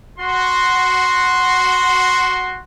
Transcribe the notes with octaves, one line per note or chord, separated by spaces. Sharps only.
F#4 C6